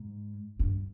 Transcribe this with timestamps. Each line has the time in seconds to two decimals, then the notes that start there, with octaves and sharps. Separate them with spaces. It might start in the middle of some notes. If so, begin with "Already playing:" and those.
Already playing: G#2
0.59 G2